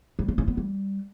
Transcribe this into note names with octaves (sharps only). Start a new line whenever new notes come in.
G3
C4
C#4
B3
G3